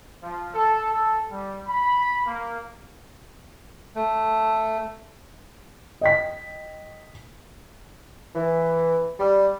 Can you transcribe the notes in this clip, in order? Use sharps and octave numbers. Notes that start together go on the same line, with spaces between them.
F3
A4
A4
G3
B5
A#3
A3
D#5 G5 B6
E3
G3